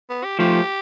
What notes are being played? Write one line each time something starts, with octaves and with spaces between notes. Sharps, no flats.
B3
G4
F3 A3 G4